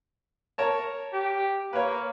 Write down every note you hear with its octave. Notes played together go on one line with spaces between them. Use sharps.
A#4 C#5 A5
G4
A#3 B4 C#5